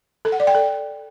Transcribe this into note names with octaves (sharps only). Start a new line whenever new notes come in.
A4
F#5
D5
G5
A4